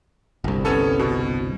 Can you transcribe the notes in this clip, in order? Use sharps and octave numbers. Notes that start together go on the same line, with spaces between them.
G1 C2
B3 C#4 A4
B2